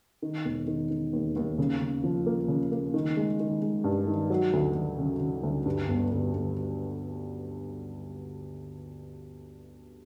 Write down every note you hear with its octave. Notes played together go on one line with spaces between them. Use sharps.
D#3
E1
D#3
D#3
D#2
D#2
C#3
C#3
F3
A#3
C#3
A#3
D#3
G#3
D#3
G#3
G2
D#3
F#3
D2
D2
C#3
C#3
D2
G2
G1
G1
G1